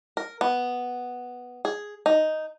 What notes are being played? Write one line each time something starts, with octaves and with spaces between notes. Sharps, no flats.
A#4
B3
G#4
D#4